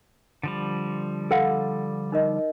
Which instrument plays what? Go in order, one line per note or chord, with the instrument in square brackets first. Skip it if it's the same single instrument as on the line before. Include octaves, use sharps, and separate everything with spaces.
[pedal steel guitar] D3 F3 G3
[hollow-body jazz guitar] A4 F5 F#5
[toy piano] D#4 A#4 D#5